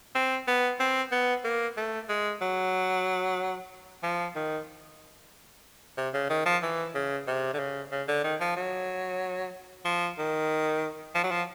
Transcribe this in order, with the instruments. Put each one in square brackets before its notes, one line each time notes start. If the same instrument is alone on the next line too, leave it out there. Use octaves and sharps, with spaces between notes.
[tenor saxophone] C4
B3
C4
B3
A#3
A3
G#3
F#3
F3
D#3
C3
C#3
D#3
F3
E3
C#3
C3
D3
C#3
C#3
D3
D#3
F3
F#3
F3
D#3
F3
F#3
F3